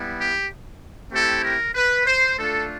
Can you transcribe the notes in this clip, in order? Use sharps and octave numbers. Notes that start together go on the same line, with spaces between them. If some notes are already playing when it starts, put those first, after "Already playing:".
Already playing: G3 B3 E4
G4
A3 C4 E4 G4 A4
A#4
B4
C5
A3 D4 F4 A4